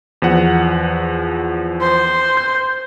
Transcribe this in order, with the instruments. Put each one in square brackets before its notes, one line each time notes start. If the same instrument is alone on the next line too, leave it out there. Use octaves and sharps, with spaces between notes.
[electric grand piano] E2 F3 F#5
[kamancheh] C5
[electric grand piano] G6